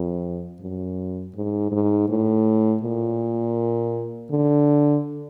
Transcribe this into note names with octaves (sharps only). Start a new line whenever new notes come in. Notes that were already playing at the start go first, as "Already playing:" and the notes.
Already playing: F2
F#2
G#2
G#2
A2
A#2
D3